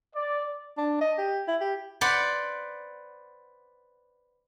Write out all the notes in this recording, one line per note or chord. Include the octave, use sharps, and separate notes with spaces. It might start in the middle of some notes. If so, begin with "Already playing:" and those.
D5
D4
D#5
G4
E4
G4
B4 C5 D5 F#5